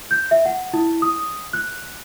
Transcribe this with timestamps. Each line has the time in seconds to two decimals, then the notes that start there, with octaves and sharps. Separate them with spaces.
0.11 G6
0.31 E5
0.46 F#5
0.73 E4
1.02 D#6
1.53 F#6